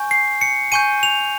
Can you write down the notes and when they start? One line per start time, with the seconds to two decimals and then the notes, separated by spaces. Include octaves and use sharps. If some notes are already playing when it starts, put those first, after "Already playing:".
Already playing: G#5 C#6 G6
0.11 C7
0.41 C#7
0.72 G#5 C#6 G6 D#7
1.03 F7